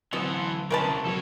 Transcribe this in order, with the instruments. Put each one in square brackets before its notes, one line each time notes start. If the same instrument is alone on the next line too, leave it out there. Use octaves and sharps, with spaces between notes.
[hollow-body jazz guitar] D2 F#3 C4 [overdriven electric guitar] E3 A4 [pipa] B3
[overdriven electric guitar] C2 C#3 [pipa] A#4 B4 A5
[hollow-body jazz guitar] F3 F#3 C4 [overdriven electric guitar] A4 C#5